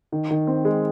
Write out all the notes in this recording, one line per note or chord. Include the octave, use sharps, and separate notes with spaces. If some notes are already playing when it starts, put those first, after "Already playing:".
D#3
D#3
C4
G#3